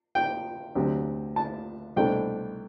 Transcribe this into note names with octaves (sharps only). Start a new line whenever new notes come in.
G5
D2 C3 F#3 C4
A5
C2 B2 A3 D4 G5